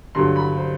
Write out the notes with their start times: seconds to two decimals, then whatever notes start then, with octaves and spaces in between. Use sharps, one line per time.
0.15 G2 D3 F#3 C6
0.36 B5
0.57 C5